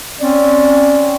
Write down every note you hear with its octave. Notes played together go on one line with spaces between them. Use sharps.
C4 C#4 D5